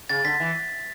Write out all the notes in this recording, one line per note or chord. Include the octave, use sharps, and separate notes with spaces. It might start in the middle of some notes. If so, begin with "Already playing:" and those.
C#3 A6
D3 B6
E3